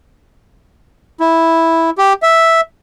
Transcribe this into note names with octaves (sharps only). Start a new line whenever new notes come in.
E4
G4
E5